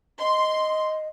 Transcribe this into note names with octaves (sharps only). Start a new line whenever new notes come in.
D#5 C6